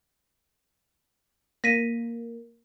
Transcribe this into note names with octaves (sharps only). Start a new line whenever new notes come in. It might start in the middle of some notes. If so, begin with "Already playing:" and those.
A#3 A#6 B6 D#7